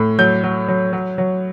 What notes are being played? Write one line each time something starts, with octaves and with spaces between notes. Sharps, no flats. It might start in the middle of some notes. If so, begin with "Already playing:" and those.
Already playing: A2
F#3 G6
F#3
F#3
F#3
F#3